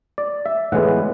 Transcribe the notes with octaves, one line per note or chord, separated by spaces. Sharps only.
D5
E5
A2 E3 G#3 B3 F#5